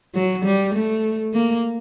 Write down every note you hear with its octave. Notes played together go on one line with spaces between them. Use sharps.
F#3
G3
A3
A#3